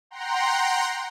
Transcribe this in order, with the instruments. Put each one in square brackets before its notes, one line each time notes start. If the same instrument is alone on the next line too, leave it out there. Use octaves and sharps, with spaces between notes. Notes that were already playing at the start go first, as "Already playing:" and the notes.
[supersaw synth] F#5 G5 A#5 C6